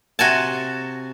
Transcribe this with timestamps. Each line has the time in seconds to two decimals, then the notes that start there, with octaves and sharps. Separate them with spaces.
0.19 C3 F#4 G#5 A5